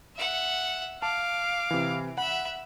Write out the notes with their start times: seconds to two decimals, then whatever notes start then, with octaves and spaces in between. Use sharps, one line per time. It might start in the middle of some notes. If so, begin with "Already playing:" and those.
0.16 E5 F#5
1.02 F5 A5 D6
1.71 C3 E3
2.18 E5 F#5 B5